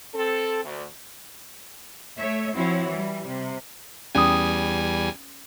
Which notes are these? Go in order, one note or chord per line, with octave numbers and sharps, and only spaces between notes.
C4 A4
D2
A3 C#5 E5
F3 C4 E4 F#4 C#5
E3 G3
C3
E2 G3 C#4 G#5 D#6